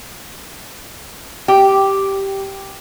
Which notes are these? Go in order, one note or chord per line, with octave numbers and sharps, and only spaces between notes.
G4